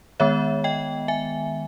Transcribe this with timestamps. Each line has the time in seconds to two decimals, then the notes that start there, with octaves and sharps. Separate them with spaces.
0.20 D#3 G#3 B3 C#5 E5
0.64 D#5 G5
1.08 E5 G#5